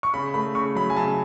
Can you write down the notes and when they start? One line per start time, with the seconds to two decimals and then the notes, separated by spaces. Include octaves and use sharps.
0.03 C#6
0.14 C#3 B5
0.34 A3 B5
0.55 C#3 C#6
0.75 F#3 B5
0.90 G#5
0.97 C#3 A5